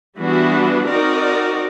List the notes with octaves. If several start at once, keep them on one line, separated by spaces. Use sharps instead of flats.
E3 G3 B3 D4 F#4
C4 D#4 F#4 A#4 D5